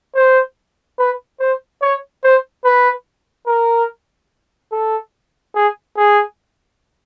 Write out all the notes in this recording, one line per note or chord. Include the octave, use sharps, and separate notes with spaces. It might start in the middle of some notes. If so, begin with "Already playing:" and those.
C5
B4
C5
C#5
C5
B4
A#4
A4
G#4
G#4